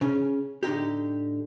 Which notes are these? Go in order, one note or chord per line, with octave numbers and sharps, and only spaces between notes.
C#3 C#4
A2 D3 D#4 G4